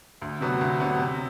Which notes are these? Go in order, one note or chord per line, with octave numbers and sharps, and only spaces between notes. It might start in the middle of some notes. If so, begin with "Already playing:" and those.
D2
C3 F#3 B3 F#4
D2
C3 F#3 B3 F#4
C3